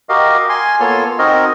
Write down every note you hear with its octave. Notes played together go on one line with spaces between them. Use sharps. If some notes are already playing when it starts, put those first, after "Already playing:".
F#4 G4 A#4 D#5 F5
G#5 C6
A#3 B3 F4 A4 C#5 C6
C4 D#4 F#4 A#4 D#5